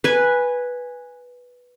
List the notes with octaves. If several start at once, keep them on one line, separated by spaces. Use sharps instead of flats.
B4 G#5